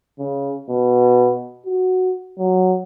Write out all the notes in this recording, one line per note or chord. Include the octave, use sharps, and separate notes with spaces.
C#3
B2
F#4
F#3